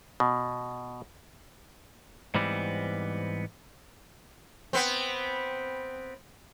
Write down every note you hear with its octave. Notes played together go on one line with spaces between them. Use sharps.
B2
G#2 E3 G3 B3 C4
B3 C4